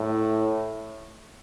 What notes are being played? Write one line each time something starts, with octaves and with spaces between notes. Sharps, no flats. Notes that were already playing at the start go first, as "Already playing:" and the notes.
Already playing: A2